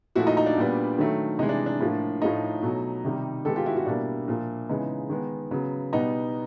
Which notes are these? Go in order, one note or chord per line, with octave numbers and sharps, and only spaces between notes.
A#2 F3 A3 E4 F#4
D#4
D#4
D4
A#2 G3 B3
D#3 F#3 A3
C3 E3 G#3 D#4
D4
D4
A2 F3 A#3
A2 F3 A3 D#4
B2 F#3 A3
C3 D#3 G3
D#3 G#3 B3 G4 A4
F4 G4
E4 F#4
E4 F#4
B2 G3 A#3 D4 E4
A#2 F3 A#3
C#3 E3 G#3 B3 D#4
D#3 G#3 B3
C#3 F#3 B3
B2 G3 B3 D#4